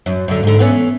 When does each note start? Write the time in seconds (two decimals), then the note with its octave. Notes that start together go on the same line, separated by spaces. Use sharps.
0.06 F#2
0.28 F#2 D3
0.43 G#2 D3
0.59 E3 B3 C#4